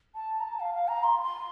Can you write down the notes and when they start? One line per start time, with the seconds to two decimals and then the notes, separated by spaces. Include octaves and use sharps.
0.15 A5
0.40 A#5
0.44 A5
0.60 F5
0.74 F5
0.88 A#5
1.03 C6
1.23 C6